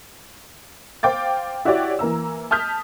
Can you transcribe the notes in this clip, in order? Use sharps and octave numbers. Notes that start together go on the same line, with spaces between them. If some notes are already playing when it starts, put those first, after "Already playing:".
C5 F5 G5 D6 A6
E4 F#4 G4 C#5 D5
E3 A#3 A#5 E6
A5 D#6 F6 G6 B6